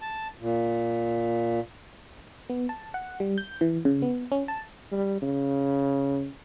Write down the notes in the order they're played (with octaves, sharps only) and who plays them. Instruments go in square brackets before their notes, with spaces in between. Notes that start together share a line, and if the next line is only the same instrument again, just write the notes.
[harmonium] A5
A#2
[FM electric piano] B3
A5
F#5
G3
G6
E3
C#3
B3
C#4
A5
[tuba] G3
C#3